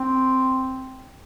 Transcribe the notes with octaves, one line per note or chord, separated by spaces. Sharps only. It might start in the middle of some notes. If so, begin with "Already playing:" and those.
Already playing: C4